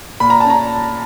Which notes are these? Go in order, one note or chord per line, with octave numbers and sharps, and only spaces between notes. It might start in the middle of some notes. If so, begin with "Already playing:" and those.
A#2 B5
A#5
C#4 A5
A#5